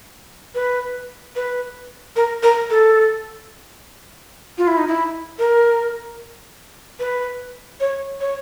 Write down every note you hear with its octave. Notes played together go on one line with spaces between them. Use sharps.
B4
B4
A#4
A#4
A4
F4
E4
D#4
E4
A#4
B4
C#5
C#5